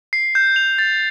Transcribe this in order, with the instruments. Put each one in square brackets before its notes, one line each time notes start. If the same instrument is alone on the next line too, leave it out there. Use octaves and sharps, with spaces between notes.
[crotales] C7
G6
F7
A6